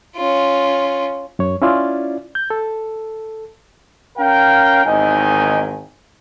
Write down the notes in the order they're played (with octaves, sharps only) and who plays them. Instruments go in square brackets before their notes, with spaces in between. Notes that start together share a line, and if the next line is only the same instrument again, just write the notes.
[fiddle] C#4 F4
[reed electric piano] F#2 C#5
C#4 E4 F4 D5
G6
A4
[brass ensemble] C#4 A#4 F5 G5
G#1 E2 D#3 D#5 G5 G#5